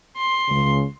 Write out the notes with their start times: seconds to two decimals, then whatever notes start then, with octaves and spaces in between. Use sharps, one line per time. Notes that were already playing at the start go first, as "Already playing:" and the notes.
0.17 C6
0.49 C#2 C#3